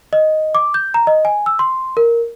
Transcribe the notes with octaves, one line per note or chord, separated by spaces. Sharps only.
D#5
D6
G6
A#5
D#5
G#5
E6
C6
A#4